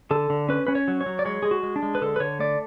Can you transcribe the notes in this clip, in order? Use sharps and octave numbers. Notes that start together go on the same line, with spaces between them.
D3 A4
D3
C#4 B4
C#4 B4
C#5
F#3
C#5
F#3
D5
G#3 C#5
G#3 G#4
F#4
G#3
D4
G#3
B4
D3 A4
B4
D3 C#5
A3 D5